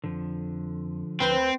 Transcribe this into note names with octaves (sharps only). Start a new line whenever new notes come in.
F2 D3 F3
D2 C4 B4 C5